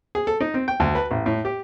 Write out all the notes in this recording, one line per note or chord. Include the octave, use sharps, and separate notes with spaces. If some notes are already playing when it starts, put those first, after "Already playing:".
G#4
A4
D#4
C4
G5
D2
B4
A1
A2
G4